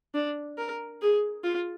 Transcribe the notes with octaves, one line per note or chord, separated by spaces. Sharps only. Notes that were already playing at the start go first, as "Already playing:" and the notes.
D4
A#4
G#4
F4